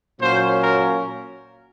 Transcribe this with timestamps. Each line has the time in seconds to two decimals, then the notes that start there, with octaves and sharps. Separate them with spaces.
0.20 A#2 F#3 A#3 C#4 C5
0.61 A#4